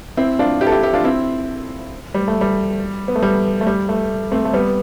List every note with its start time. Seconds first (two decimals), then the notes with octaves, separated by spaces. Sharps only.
0.17 C4 E4
0.39 D4 F4
0.61 E4 G4
0.67 A4
0.72 E4 G4
0.83 E4 G4
0.94 D4 F4
1.04 C4 E4
2.14 G3
2.28 A3
2.41 G3
3.08 B3
3.15 A3
3.22 G3
3.61 A3
3.67 G3
3.89 A3
4.32 A3 C4
4.45 A3
4.53 G3 B3